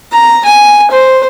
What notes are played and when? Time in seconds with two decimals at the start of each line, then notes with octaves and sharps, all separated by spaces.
0.12 A#5
0.45 G#5
0.91 C5